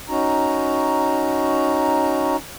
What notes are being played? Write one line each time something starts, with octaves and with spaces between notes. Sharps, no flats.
C#4 D#4 F#4 A#5